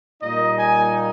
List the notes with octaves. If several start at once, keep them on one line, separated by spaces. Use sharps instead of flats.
A#2 G3 A#3 D#4 D#5
G#5